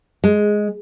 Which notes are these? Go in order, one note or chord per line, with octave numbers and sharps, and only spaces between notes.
G#3